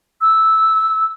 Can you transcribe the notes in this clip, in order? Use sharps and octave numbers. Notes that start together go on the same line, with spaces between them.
E6